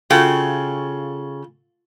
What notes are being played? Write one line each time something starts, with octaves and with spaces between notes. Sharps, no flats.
C#3 F4 F#4 A4 G5